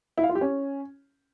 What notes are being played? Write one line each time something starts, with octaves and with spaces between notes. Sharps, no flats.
E4
F5
F4
G4
C#4